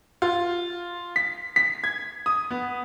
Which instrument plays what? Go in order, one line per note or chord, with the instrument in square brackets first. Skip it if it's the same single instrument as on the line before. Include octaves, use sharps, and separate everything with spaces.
[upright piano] F4
B6
B6
G#6
D#6
B3